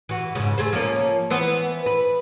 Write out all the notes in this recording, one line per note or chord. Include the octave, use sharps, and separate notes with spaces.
E3 F#4
F2 G#2 C#3
A3 G#4 C5
F3 A#3 C#4
E3 B3 C5
B4